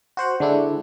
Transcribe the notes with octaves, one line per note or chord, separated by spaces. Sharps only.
F#4 C5 F#5
D3 G#3 D4 E4